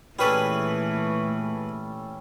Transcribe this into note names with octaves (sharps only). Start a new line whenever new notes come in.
A#2 E3 G3 A3 C#4 G#4 A4 B4